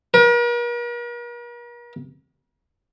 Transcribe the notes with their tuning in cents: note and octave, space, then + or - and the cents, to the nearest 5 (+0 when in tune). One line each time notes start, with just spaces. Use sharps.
A#4 +45